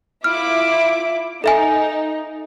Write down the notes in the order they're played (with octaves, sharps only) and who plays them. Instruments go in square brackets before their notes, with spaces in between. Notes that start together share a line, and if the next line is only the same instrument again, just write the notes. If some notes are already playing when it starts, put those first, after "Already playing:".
[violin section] E4 F4 D6 [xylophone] F6
[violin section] D#4 [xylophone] A4 E5 G#5